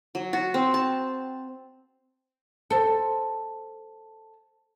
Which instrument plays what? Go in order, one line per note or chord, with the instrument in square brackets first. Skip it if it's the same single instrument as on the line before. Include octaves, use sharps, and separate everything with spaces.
[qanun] F#3
F#4
C4
A5
[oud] A4 C5